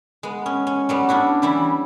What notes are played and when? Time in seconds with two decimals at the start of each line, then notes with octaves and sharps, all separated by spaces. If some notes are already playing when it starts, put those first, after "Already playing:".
0.23 G#3 B3
0.46 C#4
0.67 C#4
0.89 F#3 G3 B3
1.09 C#4 D4 E4 F#4
1.42 E3 G3 E4 G4